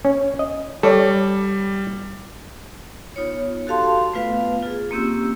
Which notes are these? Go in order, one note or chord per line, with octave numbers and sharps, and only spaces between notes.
C#4
D#5
G3 A4 C#5 D5
B3 D#4 F4 C#5
F#4 G4 A4 F5 A5 C6
A3 B3 F4 B4 F5
F4 G#4
A#3 C4 C#4 G4 E6